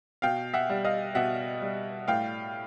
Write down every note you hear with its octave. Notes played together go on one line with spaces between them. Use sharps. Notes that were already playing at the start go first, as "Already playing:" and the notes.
B2 F5 G5
E5 F#5
G3
D#5 F5
B2 E5 F#5
G3
A2 F5 G5